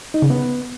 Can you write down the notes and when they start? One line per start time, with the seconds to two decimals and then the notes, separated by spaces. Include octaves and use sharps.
0.14 D#4
0.22 C#3
0.30 B3